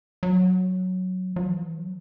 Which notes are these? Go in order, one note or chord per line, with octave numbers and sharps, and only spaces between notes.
F#3
F#3
E3
F#3